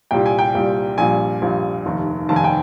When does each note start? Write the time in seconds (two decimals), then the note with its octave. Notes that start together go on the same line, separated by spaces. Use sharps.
0.11 C2 A#2 G3 G5
0.26 G#5
0.39 G5
0.55 C2 A#2 G3
0.98 A#1 A#2 G3 G#5
1.42 A#1 A#2 G3
1.86 F1 D#2 D#3
2.29 F1 D#2 D#3 A5
2.36 G#5
2.44 G5